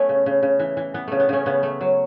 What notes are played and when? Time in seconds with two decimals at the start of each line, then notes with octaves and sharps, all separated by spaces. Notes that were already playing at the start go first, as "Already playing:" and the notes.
Already playing: A3 B3 C#4
0.09 C#3
0.26 C#3
0.43 C#3
0.59 E3
0.77 E3
0.94 E3 B3
1.08 C#3 A3
1.20 B3
1.29 C#3 A3 C#4
1.46 C#3 B3
1.63 A3
1.81 F#3